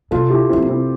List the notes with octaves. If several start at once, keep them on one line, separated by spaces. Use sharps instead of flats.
C3 F4 A4
E4 G4
D3 C4 E4
C3
C4 E4